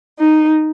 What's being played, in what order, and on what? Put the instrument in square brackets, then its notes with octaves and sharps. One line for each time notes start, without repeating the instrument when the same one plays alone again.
[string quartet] D#4